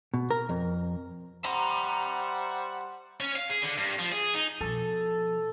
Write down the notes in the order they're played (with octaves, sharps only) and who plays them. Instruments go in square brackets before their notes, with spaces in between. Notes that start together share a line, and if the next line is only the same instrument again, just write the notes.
[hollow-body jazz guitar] B2
A#4
F2
[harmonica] G3 C5 F#5 [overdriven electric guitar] E5 A#5
[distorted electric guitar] C#4
F5
G#4
D3
G2
F3
G#4
D#4
[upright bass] B2 F3 [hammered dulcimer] A4